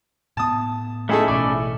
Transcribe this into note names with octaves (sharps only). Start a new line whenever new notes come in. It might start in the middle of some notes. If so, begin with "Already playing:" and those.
A2 B3 A5 D#6
A3 C#4 D#4 E4 G#4 A4
A1 B2 D5